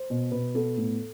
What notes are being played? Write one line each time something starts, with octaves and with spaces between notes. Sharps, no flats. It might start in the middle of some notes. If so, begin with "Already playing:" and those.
Already playing: C5
B2
B2 B4
B3 A4
A2